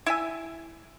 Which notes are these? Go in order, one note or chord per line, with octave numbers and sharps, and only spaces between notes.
E4 E5 G#5